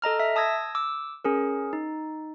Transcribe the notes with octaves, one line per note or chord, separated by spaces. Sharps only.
A4 D#5 A#5 F6
E5
A5 D#6 E6 G#6 A#6
D6 E6
C#4 G#4 A#4
D#4